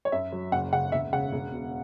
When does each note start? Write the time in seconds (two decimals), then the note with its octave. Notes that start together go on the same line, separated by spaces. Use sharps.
0.05 C#5
0.12 F#2 E5
0.32 F#3
0.52 F#1 F#5
0.72 C#3 F#5
0.92 E1 E5
1.12 C#3 F#5
1.33 E1
1.52 B2